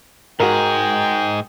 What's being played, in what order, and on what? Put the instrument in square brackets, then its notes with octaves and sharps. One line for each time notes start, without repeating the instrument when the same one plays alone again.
[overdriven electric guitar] G#2 G#4 [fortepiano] F#4 A#4 [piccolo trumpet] G5